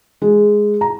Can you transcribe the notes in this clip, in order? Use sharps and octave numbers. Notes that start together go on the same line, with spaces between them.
G#3
A#5